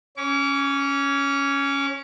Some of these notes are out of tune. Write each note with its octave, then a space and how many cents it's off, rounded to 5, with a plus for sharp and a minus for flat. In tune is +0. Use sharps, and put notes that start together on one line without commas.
C#4 +0 D6 -45